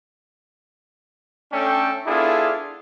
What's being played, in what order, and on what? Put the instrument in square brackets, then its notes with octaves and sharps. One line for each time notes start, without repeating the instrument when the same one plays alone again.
[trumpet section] A3 C#4 D4 A4 G5
B3 D4 E4 F4 G#4 A4